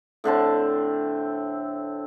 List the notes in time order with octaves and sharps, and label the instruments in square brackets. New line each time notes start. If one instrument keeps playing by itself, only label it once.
[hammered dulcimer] A2 D3 C4 A5